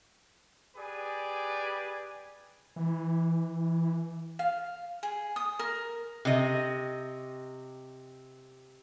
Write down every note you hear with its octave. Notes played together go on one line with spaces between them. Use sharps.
G4 G#4 B4 D5 G#5
E3
F5
G#4
D#6
A#4
C3 D#5